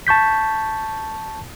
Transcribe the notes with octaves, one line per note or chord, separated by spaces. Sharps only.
A5 C#6 G6 B6